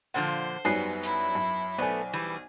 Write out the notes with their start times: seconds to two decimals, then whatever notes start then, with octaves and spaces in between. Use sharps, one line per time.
0.14 A#2 D3 F3 C5 F#5
0.65 F#2 F#3 G3 B3 D#4 G#5 C7
1.03 E4
1.35 F#2
1.78 B1 A3 B3 C5 D5 G#5
2.13 E3 G3 G#4